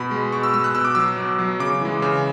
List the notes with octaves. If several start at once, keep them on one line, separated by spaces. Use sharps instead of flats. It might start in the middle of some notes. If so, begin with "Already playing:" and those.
Already playing: B2 B5
G#3
B2 C#6
E6
G#3 E6
F#6
B2 E6
D6
F#3 E6
B2
F#3
C#3 D6
E3 G#3
C#3